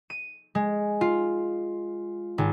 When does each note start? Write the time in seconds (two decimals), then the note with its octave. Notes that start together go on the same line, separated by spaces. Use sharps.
0.10 D#7
0.55 G#3
1.01 F4
2.38 G#1